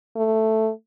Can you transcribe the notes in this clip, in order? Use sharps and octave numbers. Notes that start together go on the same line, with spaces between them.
A3